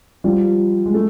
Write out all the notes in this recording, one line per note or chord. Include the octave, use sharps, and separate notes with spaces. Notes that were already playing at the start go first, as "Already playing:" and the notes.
F3 G3
G#3
A3